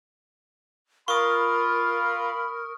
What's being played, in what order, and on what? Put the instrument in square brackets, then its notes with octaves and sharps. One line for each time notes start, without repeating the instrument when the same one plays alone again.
[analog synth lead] F4 [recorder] A#4 [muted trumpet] B5 [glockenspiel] C#6 D#6